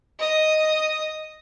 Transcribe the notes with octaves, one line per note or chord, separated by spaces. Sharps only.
D#5 D#6